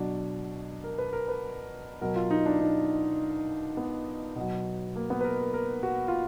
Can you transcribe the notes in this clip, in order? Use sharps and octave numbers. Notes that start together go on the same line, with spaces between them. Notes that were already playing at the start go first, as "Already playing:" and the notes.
Already playing: B2 F#3 D4
A#4
B4
A#4
B4
B2 F#3 A#4
F4
D#4
D4
D#4
B3
B2 F#3
A#3
B3
B4
A#4
A#4
A#4
F#4
F4